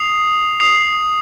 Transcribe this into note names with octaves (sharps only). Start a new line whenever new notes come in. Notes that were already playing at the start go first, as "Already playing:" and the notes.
Already playing: D#6 C7 F7
D#6 C7 F7